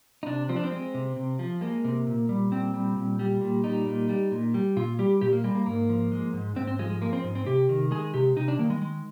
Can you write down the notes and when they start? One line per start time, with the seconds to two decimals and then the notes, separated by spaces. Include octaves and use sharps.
0.23 D#4
0.26 C3 D4
0.49 F3 C4
0.56 D4
0.64 C4
0.72 G#3
0.94 C3
1.16 C3
1.39 F3
1.61 G#3 A#3
1.84 C3
2.07 A#2
2.29 G3
2.51 A#2 C4
2.74 G3
2.96 A#2
3.19 G3
3.41 A#2
3.64 G3 D#4
3.86 A#2
4.09 G3
4.32 A#2
4.54 G3
4.77 A#2 F4
4.99 G3 G4
5.21 A#2 G4
5.33 A#3
5.44 G3 G#3
5.55 A#3
5.66 G#2 A#3
5.90 F3
6.12 G#3
6.33 G#2
6.56 G#2 C4
6.68 C4
6.79 F3 G#3
6.90 G#3
7.02 G#3 A#3
7.13 C4
7.24 G#2
7.35 C4
7.47 C3 G4
7.69 D#3
7.91 G#3 G#4
8.14 C3 G4
8.36 C3 D#4
8.48 D4
8.59 D#3 A#3
8.70 G#3
8.82 G#3